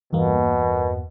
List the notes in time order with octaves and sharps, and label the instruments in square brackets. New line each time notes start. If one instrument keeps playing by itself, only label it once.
[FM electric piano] E2 G2 A#3 [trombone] B2